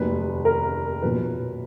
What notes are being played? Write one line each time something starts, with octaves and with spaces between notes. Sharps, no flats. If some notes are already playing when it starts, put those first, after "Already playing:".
Already playing: F1 D#2 D#3 F#3 B4
A#4
B1 A#2 F3 B4